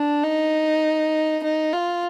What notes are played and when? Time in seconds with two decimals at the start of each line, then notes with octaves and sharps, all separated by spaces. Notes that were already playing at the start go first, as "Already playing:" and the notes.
Already playing: D4
0.23 D#4
1.44 D#4
1.73 F4